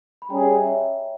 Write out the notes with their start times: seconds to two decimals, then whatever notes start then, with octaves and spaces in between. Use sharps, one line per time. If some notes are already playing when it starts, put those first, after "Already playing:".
0.22 B5
0.30 G3 C#4 G#4 G5 A#5
0.42 D#5 G5
0.55 C#5 E5
0.67 C#5 E5